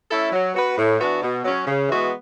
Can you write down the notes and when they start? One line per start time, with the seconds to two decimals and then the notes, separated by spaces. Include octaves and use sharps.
0.09 A3 C#4 E4 A4
0.31 F#3
0.54 B3 F#4 B4
0.77 A2
0.99 E3 B3 D4 F#4
1.21 B2
1.44 F#3 C#4
1.66 C#3
1.88 E3 G#3 B3 F#4